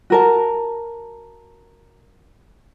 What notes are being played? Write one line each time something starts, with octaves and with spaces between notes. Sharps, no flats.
F#4 A#4 A5